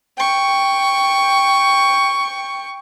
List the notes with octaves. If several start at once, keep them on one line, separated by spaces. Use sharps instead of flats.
G5 C#6